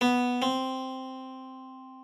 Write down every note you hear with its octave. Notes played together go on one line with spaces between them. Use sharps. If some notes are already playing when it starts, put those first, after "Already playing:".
B3
C4